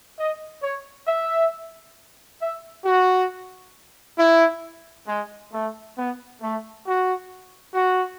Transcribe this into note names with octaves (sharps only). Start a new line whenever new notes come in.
D#5
C#5
E5
E5
F#4
E4
G#3
A3
B3
A3
F#4
F#4